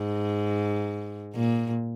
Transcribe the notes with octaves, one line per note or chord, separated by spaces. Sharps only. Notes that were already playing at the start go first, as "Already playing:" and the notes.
Already playing: G#2
A#2